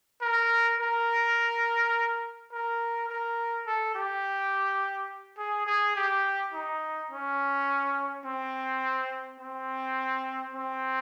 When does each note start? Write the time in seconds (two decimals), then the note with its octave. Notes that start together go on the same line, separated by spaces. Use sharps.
0.22 A#4
0.80 A#4
2.52 A#4
3.09 A#4
3.67 A4
3.95 G4
5.38 G#4
5.67 G#4
5.96 G4
6.54 D#4
7.11 C#4
8.26 C4
9.40 C4
10.55 C4